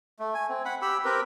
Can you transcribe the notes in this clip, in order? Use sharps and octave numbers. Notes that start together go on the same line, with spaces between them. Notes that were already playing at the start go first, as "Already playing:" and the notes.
A3
G#5
C4
F#5 B5
G4 B5 E6
C4 G4 A#4 B4